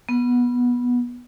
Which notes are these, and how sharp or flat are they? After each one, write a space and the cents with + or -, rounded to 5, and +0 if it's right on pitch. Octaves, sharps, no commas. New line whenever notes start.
B3 -15